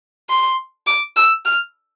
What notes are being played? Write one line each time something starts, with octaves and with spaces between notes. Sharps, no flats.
C6
D6
E6
F6